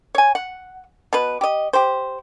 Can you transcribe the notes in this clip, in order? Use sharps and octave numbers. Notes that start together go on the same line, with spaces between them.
C#5 G#5
F#5
B2 B4
G4 D#5
G4 C5